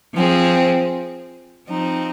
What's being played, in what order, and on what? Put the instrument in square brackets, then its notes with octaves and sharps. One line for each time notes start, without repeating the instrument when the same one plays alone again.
[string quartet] F3 C4 G#4
F3 C4 D#4